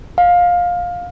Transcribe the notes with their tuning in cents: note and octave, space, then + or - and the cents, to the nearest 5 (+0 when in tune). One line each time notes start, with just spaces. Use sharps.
F5 +15